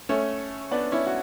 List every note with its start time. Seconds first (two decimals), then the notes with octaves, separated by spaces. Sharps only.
0.09 A3 C#4
0.71 B3 D4
0.92 C#4 E4
1.07 F#4